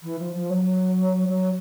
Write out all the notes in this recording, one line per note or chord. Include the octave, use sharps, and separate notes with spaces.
E3
F3
F3
F#3
F#3